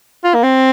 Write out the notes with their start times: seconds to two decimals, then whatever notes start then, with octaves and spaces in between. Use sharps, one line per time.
0.24 F4
0.34 A#3
0.43 C4